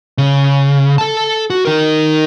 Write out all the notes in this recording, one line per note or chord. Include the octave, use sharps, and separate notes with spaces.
C#3
A4 A5
F#4
D#4 A#4